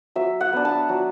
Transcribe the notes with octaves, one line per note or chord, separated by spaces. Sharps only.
F#3 E5
F#5
B3 D4
A5
F#3